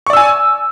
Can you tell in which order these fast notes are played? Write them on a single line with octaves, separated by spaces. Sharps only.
C#6 D5 E6 G#5